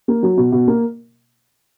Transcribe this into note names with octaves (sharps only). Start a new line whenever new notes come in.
A#3
F#3
B2
B2
A#3